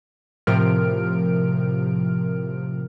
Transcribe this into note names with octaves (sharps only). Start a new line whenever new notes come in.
A2 C3 F3 A#4 F6 D7